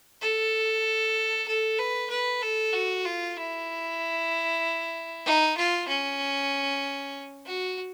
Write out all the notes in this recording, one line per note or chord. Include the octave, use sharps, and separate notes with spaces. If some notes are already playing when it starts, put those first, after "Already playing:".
A4
A4
B4
B4
A4
F#4
F4
E4
D#4
F4
C#4
F#4